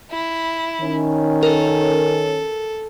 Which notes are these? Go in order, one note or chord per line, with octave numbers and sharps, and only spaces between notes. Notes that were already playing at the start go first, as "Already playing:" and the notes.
E4
D#3 C#4
A4 A#4